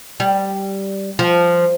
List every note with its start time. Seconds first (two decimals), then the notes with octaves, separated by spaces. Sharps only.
0.20 G3
1.19 F3